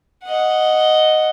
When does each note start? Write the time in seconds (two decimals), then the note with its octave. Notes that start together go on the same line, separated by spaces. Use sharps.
0.25 D#5 F#5